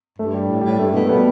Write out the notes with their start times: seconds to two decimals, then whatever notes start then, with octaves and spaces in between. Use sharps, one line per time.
0.18 G2 A3
0.34 G3
0.49 A2
0.61 G3
0.64 A2
0.79 G2 A3
0.94 B2 A3
1.05 A3
1.09 B2 G3 B3